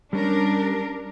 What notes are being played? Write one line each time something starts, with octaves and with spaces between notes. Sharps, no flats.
G3 C#4 D4 A#4